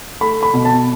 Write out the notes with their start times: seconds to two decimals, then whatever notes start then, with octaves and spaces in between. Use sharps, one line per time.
0.21 A3 B5
0.43 B5
0.54 B2
0.65 A5